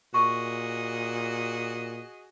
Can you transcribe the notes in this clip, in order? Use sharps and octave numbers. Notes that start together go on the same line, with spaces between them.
A#2 F#4 G#4 D#5 C#6